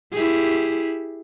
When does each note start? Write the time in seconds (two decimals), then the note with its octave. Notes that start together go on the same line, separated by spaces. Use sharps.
0.12 E4 G4 G#4